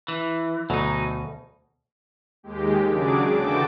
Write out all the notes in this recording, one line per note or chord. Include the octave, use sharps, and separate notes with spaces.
E3
D2 B2 F#3 D#4
D#2 G#3 G4
C#3 F#3 D4 G#4 D6
D3 E3 F#4 G5 A5 D6